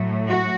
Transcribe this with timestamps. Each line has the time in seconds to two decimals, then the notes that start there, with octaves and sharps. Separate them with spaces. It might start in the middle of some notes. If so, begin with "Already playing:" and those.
Already playing: A2 F#3 A3
0.27 F#4